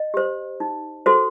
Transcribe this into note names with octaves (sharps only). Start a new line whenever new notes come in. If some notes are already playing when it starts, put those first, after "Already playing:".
Already playing: D#5
G4 C5
D#4
F#4 A4 C5